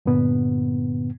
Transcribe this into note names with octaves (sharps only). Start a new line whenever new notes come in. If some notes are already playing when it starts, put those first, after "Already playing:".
G2 A#2 D3 B3